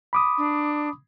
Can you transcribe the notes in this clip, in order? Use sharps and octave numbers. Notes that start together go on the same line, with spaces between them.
B5 D6 D#6
D4